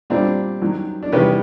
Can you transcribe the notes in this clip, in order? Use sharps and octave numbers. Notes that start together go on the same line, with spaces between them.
A#2 G3 C4 D4
F#2 D#3 F#3
D4
E2 C3 D#3 G3 B3 C#4